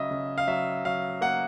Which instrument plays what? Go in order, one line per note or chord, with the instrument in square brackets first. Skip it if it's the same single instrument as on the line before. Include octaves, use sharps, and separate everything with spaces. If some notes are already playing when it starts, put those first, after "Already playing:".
Already playing: [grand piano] C#3 F#3 D#5 E5
C#3
F5
F#3 E5
F#3 F5
A#3 F#5